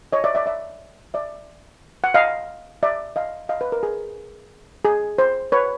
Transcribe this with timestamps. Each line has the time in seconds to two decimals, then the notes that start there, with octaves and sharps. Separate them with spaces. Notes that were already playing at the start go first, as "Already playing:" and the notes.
0.12 C#5 D#5
0.24 D5 E5
0.35 D5 E5
0.46 D5 E5
1.14 D5 E5
2.04 F#5
2.14 D#5 F5
2.83 D5 E5
3.16 D#5 F5
3.49 D#5 F5
3.61 B4
3.72 A#4
3.83 G#4
4.85 G#4
5.18 C5
5.52 B4 C#5